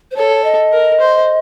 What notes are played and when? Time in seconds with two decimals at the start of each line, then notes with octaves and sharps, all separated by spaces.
0.11 C5
0.16 A4 C#5
0.44 D#5
0.73 A#4
1.00 C5